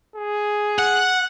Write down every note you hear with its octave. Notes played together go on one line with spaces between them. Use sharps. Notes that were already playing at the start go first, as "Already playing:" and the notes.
G#4
F#5 F#6